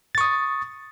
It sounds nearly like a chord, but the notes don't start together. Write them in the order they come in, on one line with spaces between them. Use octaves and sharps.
A6 C#6 D#6